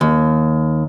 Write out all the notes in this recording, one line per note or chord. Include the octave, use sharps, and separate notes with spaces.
D#2